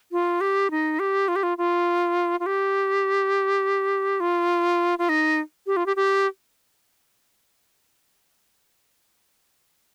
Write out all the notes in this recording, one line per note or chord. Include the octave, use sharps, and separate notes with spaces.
F4
G4
D#4
G4
F4
G4
F4
F4
F4
G4
F4
F4
D#4
G4
F4
G4
G4